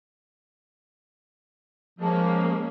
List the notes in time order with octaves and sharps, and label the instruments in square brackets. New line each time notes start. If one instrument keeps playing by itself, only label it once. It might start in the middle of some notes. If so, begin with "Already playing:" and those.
[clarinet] F3 [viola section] G#3 A#3 C#4